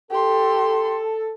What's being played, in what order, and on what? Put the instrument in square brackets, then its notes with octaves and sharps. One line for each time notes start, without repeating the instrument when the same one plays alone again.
[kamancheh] G4 C6 [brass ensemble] A4